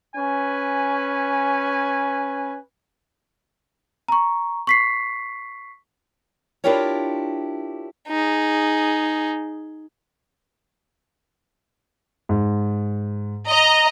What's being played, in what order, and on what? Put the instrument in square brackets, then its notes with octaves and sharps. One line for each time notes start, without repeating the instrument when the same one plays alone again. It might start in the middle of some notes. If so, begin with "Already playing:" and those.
[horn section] C#4 B4 G#5
[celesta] A#5 C#6
C#6 B6 C7
[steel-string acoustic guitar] D4 E4 F4 G4 A#4 C#5
[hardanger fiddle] D#4 G#4
[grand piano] G#2
[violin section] D#5 A#5